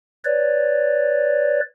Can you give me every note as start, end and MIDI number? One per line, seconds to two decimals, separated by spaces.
0.24 1.60 71
0.24 1.60 73
0.24 1.60 74